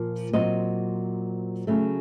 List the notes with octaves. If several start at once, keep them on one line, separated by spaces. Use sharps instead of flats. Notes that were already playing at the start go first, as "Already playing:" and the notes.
Already playing: A#2 F3 A#3
A#2 F#3 C4 D#5
C#3 F#3 A3